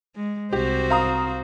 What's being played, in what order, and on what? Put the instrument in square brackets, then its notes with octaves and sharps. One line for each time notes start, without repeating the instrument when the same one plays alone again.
[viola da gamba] G#3
[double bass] C2 [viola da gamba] C4 F#4 C5 [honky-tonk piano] G4
[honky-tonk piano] F5 A#5 D#6